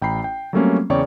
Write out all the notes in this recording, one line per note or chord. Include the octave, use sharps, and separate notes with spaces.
A1 G5 A#5 B5 C7
G5
F#3 G3 A3 A#3 C4 C#4
E2 C#3 C#5 D5 G5 C#6